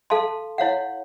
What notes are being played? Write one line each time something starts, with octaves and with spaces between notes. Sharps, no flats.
A4 F5 A5 C6
E4 C#5 F5 F#5